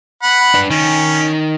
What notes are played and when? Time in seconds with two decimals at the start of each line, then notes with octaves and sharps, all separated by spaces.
0.23 F#5 B5
0.54 D4 B4
0.70 D#3 C#4